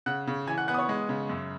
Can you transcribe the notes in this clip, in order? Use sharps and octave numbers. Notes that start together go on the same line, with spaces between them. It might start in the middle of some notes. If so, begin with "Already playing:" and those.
C#3 F#5 F#6
C#3
E3 G#5 G#6
F#5 F#6
B3 F#5 F#6
D#6
C#5 C#6
G#3
C#3
F#2